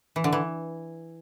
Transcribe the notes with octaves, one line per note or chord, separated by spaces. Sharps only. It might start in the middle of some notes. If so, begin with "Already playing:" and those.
E3
D3
E3